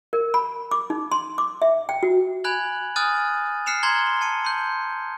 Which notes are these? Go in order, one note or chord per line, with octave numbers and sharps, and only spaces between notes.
A#4
B5
D6
D#4
C6
D6
E5
G5
F#4
G#5 B5 F#6 G#6 F#7
G#5 D#6 F6 F#6 A6 D#7
F6 F#6 C7 C#7 E7 F7
A#5 C6 G#6 C7 G7
A5 C#7 D#7
C6 G6